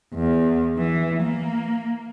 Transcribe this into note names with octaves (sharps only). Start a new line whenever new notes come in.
E2
E3
A#3